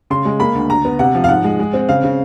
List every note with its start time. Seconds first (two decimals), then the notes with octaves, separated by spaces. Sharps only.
0.10 C#3 C6
0.25 G#3
0.40 A#3 B5
0.55 D2
0.70 D3 A#5
0.85 B3
0.99 C3 F#5
1.15 F3
1.24 F5
1.29 G#2 F#5
1.44 G#3
1.59 G#3
1.73 C4
1.89 C#3 F5
2.04 C#3